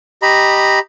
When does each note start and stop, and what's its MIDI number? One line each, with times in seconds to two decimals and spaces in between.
0.22 0.79 67
0.22 0.79 75
0.22 0.79 82
0.22 0.79 83